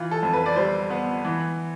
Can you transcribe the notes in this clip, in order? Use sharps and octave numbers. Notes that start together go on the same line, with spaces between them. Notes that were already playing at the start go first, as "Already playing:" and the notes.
Already playing: E3 F4
A4
F2
B4
D5
G3 C5
B3
E3